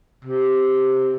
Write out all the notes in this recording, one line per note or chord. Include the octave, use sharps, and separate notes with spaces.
C3